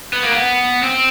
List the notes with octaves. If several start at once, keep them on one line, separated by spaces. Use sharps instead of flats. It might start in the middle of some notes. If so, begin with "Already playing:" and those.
B3
A#3
B3
C4